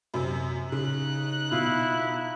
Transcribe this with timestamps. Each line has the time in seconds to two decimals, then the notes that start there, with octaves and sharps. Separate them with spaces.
0.14 F#2 C3
0.72 C#3 D#4 F#6
1.52 B2 E4 F4